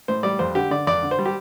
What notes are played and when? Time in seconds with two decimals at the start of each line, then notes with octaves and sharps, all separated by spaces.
0.08 A2 C5
0.23 G3 D5
0.39 F2 C5
0.55 D3 G4
0.71 D3 D5
0.87 F2 D5
1.03 D3
1.11 C5
1.19 G3
1.26 G4